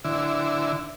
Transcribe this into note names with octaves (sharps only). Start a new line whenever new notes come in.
D3 E4